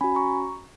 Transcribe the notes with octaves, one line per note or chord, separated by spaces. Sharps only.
C#4 F#4 G#5 B5
A#5 C#6